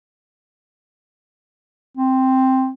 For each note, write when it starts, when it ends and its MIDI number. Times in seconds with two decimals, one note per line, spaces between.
1.97 2.70 60